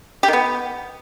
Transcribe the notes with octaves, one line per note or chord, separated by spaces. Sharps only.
G4
D#3
B3